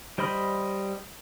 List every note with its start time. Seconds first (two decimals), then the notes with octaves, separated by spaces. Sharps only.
0.18 G3 C5 D#5 B5 F6